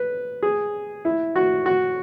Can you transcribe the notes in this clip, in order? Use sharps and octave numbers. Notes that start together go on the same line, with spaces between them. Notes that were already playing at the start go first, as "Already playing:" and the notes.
Already playing: B4
G#4
E4
F#4
F#4